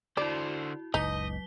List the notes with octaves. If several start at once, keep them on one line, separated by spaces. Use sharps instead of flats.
D3 E4 F#4 C5 D5
F#1 C#2 F#3 D#4 D#5 B6 G7